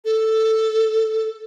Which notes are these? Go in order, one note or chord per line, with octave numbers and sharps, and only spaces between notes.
A4